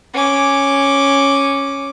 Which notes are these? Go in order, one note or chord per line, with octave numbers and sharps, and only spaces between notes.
C#4 D6